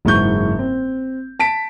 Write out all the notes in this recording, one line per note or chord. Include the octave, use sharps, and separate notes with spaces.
F#1 G#2 E3 C#6 G6
C4
A5 B6 D7